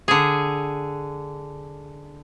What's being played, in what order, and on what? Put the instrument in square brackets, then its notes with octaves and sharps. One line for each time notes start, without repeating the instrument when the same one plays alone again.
[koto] D3 G#4